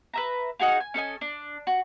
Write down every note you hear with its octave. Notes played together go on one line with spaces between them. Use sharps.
B4 E5 A#5
D#4 F#4 G#4 F5
G#5
C#4 A4 D#5 G#5
D4
F#4